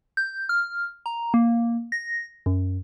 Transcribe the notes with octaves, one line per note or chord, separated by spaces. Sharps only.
G6
F6
A#5
A#3
A#6
F#2